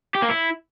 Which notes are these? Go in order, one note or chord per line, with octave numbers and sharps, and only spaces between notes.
G4
A#3
E4